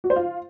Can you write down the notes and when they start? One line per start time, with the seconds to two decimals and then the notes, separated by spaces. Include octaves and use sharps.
0.04 F#4
0.10 C5
0.16 F4